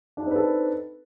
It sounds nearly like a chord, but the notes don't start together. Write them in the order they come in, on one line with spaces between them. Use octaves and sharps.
D4 D#4 C4 B4 A4